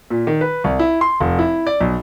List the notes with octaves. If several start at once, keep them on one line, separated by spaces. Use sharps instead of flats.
A#2
D#3
B4
C2
E4
C6
F1
E4
D5
B1